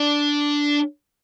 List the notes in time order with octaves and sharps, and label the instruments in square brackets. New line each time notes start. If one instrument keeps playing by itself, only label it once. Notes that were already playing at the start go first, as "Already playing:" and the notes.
Already playing: [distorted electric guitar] D4